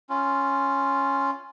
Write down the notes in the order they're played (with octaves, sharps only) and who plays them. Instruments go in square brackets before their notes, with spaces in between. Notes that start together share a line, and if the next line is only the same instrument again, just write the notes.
[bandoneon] C#4 F4